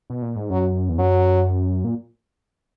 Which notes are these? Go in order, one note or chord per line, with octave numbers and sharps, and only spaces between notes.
B2
A#2
G#2
F#2 F#3
E2
F#2 F#3
A#2